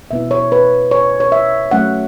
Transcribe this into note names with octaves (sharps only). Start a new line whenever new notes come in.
B2 B3 E4 E5
C#5
B4
C#5
C#5
E5
F#3 A3 C#4 F#5